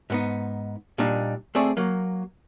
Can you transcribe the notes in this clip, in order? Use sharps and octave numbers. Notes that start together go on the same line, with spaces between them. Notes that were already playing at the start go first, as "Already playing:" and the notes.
G#2 B3 D#4
A#2 G3 D4 D#4
A3 C4 G#4 D5
F#3 A#3